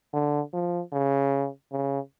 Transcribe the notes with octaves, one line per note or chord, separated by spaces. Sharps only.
D3
F3
C#3
C#3